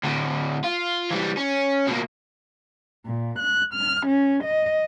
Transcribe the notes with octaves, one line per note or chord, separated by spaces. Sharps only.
D2 A2
F4
E3 G3
C#4
B2 A#3
A#2
F#6
F6
C#4
D#5